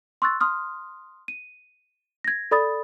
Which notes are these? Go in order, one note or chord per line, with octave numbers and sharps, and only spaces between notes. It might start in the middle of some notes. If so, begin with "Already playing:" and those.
C6 C#6 E6 F#6 A6
C6 D#6 F6
D#7
G#6 A#6
A4 D5 B5 D#6 A6